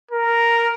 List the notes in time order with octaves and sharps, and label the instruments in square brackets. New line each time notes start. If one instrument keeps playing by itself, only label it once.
[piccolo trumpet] A#4